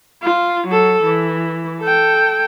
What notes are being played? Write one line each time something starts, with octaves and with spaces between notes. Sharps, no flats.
F4
F#3 A4
E3
A4 G5